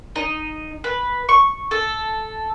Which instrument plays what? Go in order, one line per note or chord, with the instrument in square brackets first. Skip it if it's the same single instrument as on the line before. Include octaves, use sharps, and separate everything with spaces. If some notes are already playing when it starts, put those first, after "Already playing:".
[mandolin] D#4
B4
C#6
A4